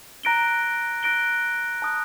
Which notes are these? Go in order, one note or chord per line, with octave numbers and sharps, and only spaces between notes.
A#5 F#6 A#6 D7 G7
F#6 A#6 D7 G7
A5 D#6 F#6